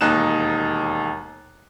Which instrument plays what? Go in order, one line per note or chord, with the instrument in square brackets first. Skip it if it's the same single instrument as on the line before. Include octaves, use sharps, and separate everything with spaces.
[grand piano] E1 D#2 D#4 F#6 E7